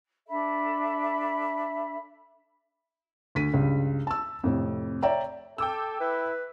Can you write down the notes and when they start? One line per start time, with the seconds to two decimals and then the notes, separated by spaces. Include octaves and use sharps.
0.28 D4 A4 E5 B5
3.35 D2 B6 D#7
3.54 C#2 G2
4.07 A5 E6
4.44 F2 A2 C3
5.03 C#5 D5 E5 G5 A#5
5.58 A4 G5 D6 E6
6.00 E4 B4